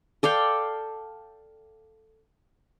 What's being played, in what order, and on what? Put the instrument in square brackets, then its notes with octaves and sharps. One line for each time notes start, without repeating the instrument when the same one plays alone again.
[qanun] A4 D5 F5 G5